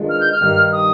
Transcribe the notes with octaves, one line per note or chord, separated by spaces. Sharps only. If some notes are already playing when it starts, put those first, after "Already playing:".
Already playing: D#3 G#3 D4 F4 B4
F6
G6
F6
G2 D#3 G3
D#6